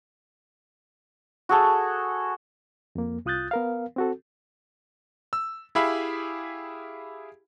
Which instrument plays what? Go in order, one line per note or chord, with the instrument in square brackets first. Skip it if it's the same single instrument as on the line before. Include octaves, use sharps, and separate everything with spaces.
[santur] F#4 G#4 A4
[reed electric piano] F2 A#3
C2 F4 D#6 F#6 G6 A6
B3 A#4 F5
C4 F#4 A4
[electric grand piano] E6
E4 G4 G#4 E5 F5 B5